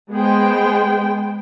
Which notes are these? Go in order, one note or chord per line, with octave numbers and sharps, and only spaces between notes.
G#3 B3 G#4 C5 G5